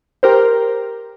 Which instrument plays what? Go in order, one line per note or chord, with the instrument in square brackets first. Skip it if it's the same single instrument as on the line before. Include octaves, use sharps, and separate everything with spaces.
[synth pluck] G4 A#4 C5